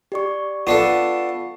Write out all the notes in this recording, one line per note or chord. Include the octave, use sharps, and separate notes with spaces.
G4 D5 C#6
B3 D4 F4 A4 C#6 C7